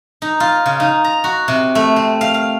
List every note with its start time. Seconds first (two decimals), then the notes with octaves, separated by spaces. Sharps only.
0.22 D#4
0.40 F4
0.66 C#3
0.80 D#4
1.04 A#5
1.24 F#4
1.48 C3
1.75 A3
1.96 C4
2.21 F5
2.34 F5